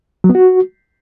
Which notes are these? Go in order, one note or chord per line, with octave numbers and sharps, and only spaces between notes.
F#3
B3
F#4